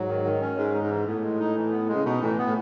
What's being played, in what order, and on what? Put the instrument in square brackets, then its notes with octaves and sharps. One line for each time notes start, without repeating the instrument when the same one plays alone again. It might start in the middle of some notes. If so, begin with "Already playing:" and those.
Already playing: [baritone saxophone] G#2 [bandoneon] F#3
[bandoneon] D#3
D#3
C#4
[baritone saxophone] G#2 [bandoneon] G#3
[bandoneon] D#4
[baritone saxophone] G#2
[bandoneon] E3
[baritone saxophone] A2 [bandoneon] B3
[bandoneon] G#3
D#4
E3
B3
G#3
[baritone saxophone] C#3
[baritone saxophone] B2 [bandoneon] D#4
[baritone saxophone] A2 [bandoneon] E3
[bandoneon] B3
[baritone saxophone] A2